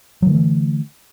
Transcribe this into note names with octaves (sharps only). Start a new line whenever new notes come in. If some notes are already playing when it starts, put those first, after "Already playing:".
D3 E3 F#3 A3